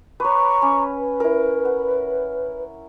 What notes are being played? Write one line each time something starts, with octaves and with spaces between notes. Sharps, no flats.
B4 C#5 A#5 C#6 D6
C#4
B4
E4 A#4
F#5